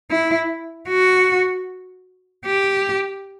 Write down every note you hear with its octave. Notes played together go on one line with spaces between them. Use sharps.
E4
F#4
G4